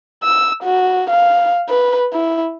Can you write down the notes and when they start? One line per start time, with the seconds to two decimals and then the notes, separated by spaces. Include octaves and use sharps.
0.24 E6
0.63 F#4
1.10 F5
1.69 B4
2.13 E4